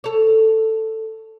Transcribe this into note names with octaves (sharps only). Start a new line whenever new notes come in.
A4 C#5